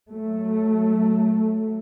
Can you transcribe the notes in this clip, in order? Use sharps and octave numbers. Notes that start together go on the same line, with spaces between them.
F#3 A3